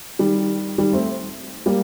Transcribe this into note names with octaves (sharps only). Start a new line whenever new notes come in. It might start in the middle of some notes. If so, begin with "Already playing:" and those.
D#3 G3
D#3 G3
A3 C4
G3 A#3